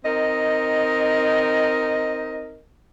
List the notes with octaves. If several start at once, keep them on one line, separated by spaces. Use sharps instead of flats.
C4 D#4 A#4 D#5